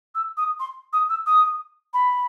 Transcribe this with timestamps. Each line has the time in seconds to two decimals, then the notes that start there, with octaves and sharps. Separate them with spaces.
0.15 E6
0.37 D#6
0.60 C6
0.93 D#6
1.09 E6
1.26 D#6
1.94 B5